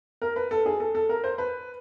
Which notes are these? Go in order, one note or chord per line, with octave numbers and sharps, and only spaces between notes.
A#4
B4
A4
G#4
A4
A4
A#4
C5
B4